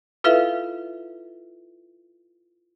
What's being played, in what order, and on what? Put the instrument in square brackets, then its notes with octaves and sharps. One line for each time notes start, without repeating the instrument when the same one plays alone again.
[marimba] E4 F4 A4 B4 E5 F5